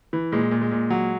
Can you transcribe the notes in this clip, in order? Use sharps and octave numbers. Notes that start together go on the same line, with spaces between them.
E3
A#2 G#3
A#2
G#3
A#2
F#3